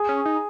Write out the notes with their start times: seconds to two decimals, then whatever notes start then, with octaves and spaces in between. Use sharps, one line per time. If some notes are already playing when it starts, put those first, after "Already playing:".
Already playing: G#4
0.09 C#4
0.26 D#4